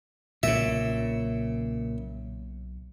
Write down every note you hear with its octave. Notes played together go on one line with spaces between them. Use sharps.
B1 A#2 C#3 E5